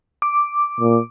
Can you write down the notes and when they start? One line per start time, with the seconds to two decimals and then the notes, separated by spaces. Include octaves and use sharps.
0.22 D6
0.80 A#2